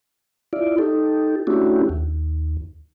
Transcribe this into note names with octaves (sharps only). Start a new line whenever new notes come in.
E4 F4 D5
D#4 G4 A4
A3 C#4 D4 E4 F#4 G4
D#2